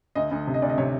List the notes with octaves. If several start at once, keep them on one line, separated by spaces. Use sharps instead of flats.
D2 D#5
D2
C3
D#5
D2 D5
D#5
C3 C#5